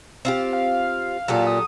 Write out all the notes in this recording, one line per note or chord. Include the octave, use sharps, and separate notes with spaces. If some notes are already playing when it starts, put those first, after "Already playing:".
C4 F4 G4
F5
A#2 F#3 G4 A4
D#6